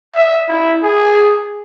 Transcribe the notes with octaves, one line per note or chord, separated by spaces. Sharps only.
E5
E4
G#4